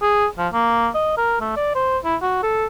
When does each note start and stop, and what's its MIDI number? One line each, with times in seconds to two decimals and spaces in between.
0.02 0.26 68
0.39 0.48 53
0.53 0.88 58
0.95 1.14 75
1.17 1.40 70
1.41 1.54 57
1.56 1.73 74
1.75 1.98 72
2.05 2.16 64
2.22 2.41 66
2.43 2.66 69